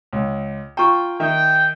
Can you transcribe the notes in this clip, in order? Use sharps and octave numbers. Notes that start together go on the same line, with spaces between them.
C#2
F4 G5 A#5 C#6
D#3 E5 G5